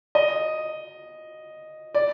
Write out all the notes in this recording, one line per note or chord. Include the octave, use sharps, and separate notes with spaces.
D#5
D5